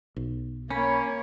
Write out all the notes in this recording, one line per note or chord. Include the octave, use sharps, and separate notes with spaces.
B1
A#3 C#4 C#5 B5